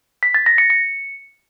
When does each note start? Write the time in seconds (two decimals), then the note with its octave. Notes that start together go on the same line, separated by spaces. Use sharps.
0.23 B6
0.34 A6
0.46 A#6
0.58 C#7
0.70 C#7